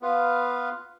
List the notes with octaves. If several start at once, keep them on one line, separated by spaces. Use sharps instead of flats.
B3 F4 B4 F5